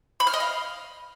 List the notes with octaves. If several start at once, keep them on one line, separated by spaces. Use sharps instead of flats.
B5
F6
D#5
F5